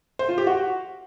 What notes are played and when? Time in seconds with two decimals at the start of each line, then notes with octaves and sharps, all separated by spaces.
0.19 C5
0.28 F4
0.38 G4
0.47 F#4